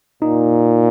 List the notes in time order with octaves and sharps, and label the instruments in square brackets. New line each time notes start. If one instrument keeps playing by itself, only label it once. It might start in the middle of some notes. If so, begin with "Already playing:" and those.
[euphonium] A#2 [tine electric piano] D#4